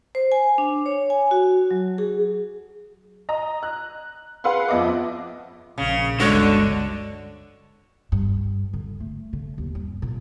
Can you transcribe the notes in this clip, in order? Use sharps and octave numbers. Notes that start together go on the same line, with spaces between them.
C5
G#5
D4
C#5
G#5
F#4
F#3
G#4
D#5 A#5
F#6
G#4 B4 F5 F#5 C6
F2 B3 D#5 E5 D6
A#1 C#3
G1 C#2 D3 G#3 F#4 C#5
G2
D3
A3
D3
D#2
G2
A#2